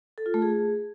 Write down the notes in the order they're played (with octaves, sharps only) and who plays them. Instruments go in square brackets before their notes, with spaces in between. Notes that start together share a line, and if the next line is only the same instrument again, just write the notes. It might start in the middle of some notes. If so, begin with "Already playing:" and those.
[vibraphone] A4
F4
A3
G#4